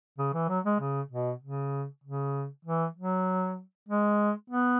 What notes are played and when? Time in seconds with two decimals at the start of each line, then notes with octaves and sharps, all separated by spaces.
0.18 C#3
0.34 E3
0.49 F#3
0.65 G#3
0.80 C#3
1.11 B2
1.42 C#3
2.04 C#3
2.65 E3
2.96 F#3
3.88 G#3
4.50 B3